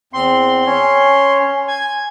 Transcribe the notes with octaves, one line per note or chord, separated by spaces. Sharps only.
E2 C4 C6
C#4 C#5
G#5 G#6